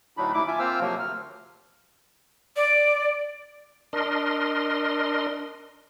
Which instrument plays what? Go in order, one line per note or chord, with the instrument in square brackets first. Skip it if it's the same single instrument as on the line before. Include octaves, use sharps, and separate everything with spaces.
[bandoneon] D2 A2 F#3 D4 D#4 B5
D#2 E4 D6
F4 E5 G#5 D6
A#3 C4 F4 C5 E6 F6
C3 F3 F#3 A#3
D2 F6
[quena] D5
[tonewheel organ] D4 A#4 D#5 C6